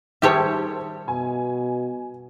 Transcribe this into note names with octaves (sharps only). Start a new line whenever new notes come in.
D#3 G3 G4 G#4 C5 C#5 E5 A5
B2 G#5